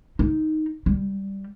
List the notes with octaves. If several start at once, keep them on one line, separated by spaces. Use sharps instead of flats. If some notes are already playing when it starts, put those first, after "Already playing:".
D#4
G3